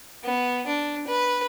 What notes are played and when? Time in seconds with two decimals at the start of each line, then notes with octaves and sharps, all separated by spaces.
0.24 B3
0.67 D4
1.07 B4